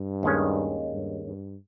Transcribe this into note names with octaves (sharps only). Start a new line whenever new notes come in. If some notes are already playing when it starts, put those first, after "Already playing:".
Already playing: G2
D#2 D#3 G#3 C#4
G2
G2